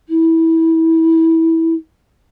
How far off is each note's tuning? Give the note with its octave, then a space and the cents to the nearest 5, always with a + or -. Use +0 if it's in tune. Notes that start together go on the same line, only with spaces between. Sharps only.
E4 -20